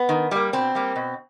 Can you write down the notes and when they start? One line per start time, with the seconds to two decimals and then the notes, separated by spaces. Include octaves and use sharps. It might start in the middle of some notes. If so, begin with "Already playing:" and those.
Already playing: B3
0.09 D#3
0.31 G3 A#3
0.53 B2 C4
0.75 G3 A#3
0.96 B2